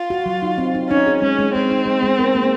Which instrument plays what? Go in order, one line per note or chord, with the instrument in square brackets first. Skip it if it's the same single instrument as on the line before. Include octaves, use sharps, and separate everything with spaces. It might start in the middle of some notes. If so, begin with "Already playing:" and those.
Already playing: [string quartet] F4
[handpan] F#4
F#3
D#4
C4
D#4
[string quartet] C#4 [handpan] D#4
[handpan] G#4
[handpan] G#3 [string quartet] C#4
[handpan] G#3
[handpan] G#3 [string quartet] C4
[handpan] D#4
G#3
G#3
A#4
A#3